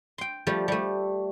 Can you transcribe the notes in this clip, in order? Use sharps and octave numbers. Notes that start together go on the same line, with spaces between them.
G5 C6
F3 G3 A3
G3 A3